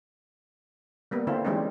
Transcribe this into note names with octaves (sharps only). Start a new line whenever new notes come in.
G3 A#3 B3
D3 A3 C4 E4 F4
E3 G3 G#3 C4 C#4 D#4